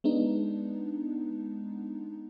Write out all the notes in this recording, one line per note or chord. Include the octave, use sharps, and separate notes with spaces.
G#3 B3 D4 D#4